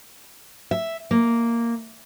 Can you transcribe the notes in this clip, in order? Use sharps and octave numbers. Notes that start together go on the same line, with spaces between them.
E5
A#3